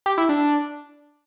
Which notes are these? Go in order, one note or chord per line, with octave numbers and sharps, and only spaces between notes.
G4
E4
D4